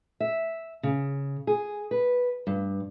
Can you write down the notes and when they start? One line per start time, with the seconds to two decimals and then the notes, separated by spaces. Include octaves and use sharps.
0.20 E5
0.83 C#3
1.47 G#4
1.91 B4
2.47 G2